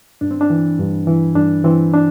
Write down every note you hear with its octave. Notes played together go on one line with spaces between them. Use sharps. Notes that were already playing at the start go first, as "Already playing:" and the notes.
G2 D4
C4
D4
E3
G2
E3
G2 D4
E3 C4
D4